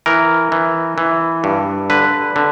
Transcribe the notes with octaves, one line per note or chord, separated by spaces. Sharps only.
E3 A#4
E3
E3
G2
D3 B4
D3